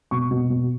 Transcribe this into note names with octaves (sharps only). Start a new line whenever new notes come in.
B2 C#6
B2
B2